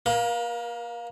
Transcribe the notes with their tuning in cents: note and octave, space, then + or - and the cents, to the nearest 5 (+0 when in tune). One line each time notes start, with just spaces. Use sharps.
A#3 +10 A#4 +40